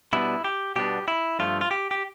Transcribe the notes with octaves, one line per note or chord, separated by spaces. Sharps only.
B2 G3 B3 D4 E4
G4
B2 G3 B3 D4 G4
E4
G2 F3 A3 F4
F4
G4
G4